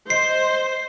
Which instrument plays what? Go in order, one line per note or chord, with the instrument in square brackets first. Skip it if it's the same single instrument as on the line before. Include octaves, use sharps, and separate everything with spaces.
[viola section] C5 [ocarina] D#5 [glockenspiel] C7